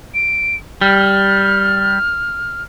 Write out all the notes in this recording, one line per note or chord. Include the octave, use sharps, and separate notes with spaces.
D7
G3 F6